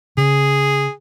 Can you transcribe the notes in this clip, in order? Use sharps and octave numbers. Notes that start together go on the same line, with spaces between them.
C#3 G#4